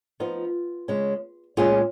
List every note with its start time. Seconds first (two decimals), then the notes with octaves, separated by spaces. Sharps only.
0.20 F3 B3 D#4 F4
0.88 C#3 G#3 C#4
1.57 A#2 G#3 C#4 F4 G#4